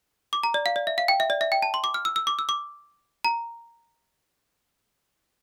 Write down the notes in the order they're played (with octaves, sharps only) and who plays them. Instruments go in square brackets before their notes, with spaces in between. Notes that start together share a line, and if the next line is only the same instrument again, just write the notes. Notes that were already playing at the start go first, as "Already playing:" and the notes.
[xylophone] D6
A#5
D5
F5
D5
E5
F5
G5
E5
D5
E5
G5
A5
C6
D6
F6
E6
E6
D6
E6
D6
A#5